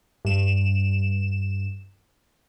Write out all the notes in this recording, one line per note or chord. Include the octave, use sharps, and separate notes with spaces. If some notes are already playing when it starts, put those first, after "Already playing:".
G2 E7